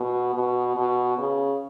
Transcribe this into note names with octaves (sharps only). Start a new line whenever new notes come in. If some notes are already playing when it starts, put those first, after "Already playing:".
Already playing: B2
B2
B2
C#3